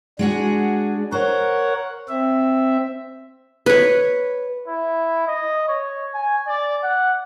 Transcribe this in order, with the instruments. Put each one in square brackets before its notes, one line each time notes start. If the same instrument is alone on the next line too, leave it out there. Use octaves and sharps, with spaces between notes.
[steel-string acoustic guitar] G#3 F#4 G#4 [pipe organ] D4
[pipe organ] A#4 C#5 F#5 [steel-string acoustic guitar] C5
[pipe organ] C4 E5
[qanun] B4 C#5
[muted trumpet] E4
D#5
C#5
G#5
D5
F#5